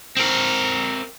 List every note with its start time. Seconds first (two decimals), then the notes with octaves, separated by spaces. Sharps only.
0.17 C4 A#4